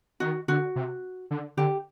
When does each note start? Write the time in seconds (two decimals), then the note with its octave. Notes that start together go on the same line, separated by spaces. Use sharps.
0.20 D#3 F#4
0.48 D3 F#4
0.76 C3
1.31 D3
1.57 D3 G4